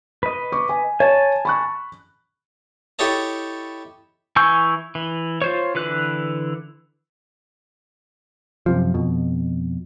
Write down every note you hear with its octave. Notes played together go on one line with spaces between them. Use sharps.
B4 D#5
C#6 D6
G#5
C#5 G#5 A5
B5 C#6 F#6
E4 G4 A4 C#5 D#5 A5
E3 G#5 C#6 E6 G6
E3
F4 C5 C#5
D3 E3 B4 F#6
F#2 C3 F3
F2 B2